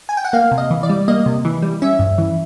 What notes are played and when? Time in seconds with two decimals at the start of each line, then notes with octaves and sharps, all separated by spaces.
0.09 G#5
0.17 G5
0.25 F#5
0.33 A#3 F5
0.52 C3
0.58 D#5
0.71 E3
0.83 D5
0.89 G3
1.08 A#3 D#5
1.26 C3
1.45 E3
1.62 G3
1.82 C#4 E5
1.99 G2
2.18 E3